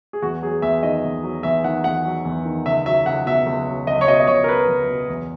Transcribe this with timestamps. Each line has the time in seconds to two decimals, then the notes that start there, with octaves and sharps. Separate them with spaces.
0.13 G#4
0.22 E2 F#4
0.42 F#3 G#4
0.62 E2 E5
0.83 D#3 D#5
1.04 E2
1.23 F#3
1.43 E2 E5
1.64 D#3 F#5
1.84 E2 F#5
2.05 F#3
2.25 E2
2.45 D#3
2.66 C#2 E5
2.86 F#3 E5
3.06 C#2 F#5
3.26 B2 E5
3.46 C#2
3.68 F#3
3.87 C#2 D#5
4.01 C#5
4.07 B2 D#5
4.20 D#5
4.27 C#2 C#5
4.44 A#4
4.48 F#3 B4
4.68 C#2
4.89 B2
5.09 E2